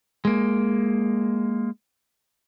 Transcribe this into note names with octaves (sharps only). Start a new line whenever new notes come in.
G#3 A#3